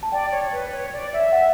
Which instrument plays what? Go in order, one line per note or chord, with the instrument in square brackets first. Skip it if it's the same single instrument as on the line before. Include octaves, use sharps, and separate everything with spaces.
[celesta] A5
[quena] D5 [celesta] G5
[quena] C#5
B4
C#5
D5
E5
[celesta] F#5